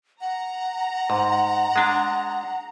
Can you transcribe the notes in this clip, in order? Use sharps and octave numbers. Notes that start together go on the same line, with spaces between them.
F#5 A#5
G#2
G#3 D4